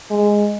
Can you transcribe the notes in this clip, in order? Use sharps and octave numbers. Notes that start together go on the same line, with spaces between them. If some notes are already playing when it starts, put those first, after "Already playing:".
G#3